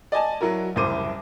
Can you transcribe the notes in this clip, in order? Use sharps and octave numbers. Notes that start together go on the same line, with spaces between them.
D5 D#5 G#5 A5
F#3 E4 F#4 A#4
F#1 C2 E3 C5 D6 D#7